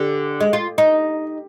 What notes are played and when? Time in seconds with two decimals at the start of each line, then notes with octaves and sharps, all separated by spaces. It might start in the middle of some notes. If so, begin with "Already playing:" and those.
Already playing: D3 G4
0.40 G#3
0.53 F4
0.78 D#4